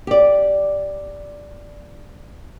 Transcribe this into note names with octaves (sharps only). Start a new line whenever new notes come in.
G4 D5